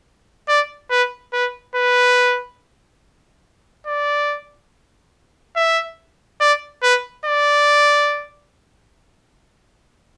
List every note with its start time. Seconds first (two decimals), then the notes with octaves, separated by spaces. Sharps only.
0.48 D5
0.90 B4
1.33 B4
1.76 B4
3.87 D5
5.56 E5
6.40 D5
6.83 B4
7.26 D5